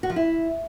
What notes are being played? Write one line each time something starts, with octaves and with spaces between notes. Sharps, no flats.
F#4
F3
E4